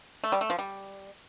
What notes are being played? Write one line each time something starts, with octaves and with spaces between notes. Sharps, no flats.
A3
G3
A3
F3
G3